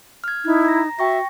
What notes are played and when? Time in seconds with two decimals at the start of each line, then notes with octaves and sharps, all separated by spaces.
0.24 F6 G#6
0.45 D#4 E4 G#6
0.65 A#5 A#6
0.99 F#4 E5 G5 C#6 A#6